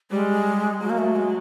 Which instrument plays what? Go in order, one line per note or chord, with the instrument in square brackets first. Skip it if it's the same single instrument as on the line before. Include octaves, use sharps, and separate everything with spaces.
[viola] G3 [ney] G#3
[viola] F#3 [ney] G#3
[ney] A#3
A3
G#3